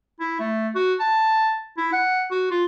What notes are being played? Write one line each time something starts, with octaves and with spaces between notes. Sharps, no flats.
E4
A3
F#4
A5
E4
F#5
F#4
F4